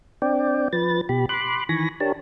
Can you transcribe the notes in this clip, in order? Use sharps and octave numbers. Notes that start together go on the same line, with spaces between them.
C4 D4 D5 G5
F3 B4 A6
B2 G4 B5
B5 C6 D6 F#6
D#3 E3 G#5 B5 C#6 A#6
D4 G4 A#4 C#5 A5